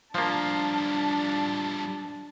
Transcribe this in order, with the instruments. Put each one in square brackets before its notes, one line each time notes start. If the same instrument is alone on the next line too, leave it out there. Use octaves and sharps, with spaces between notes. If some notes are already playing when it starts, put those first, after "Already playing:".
[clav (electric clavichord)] F3 A#3 [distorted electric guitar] G3 F4 [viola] D4 A5